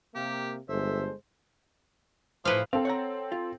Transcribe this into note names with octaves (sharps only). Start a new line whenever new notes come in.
C3 A#3 G4
G1 G#3 A4 C5 E5
A2 E3 F3 B4 F5
C4 A4 F5
C#5 F#5 A#5
F4